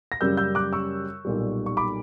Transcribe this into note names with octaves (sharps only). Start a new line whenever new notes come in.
A#6
F#2 C#3 G3 A#3 E6 G6
E6 G6
D6 F#6
C#6 E6
B1 A#2 G3
C#6
B5 D6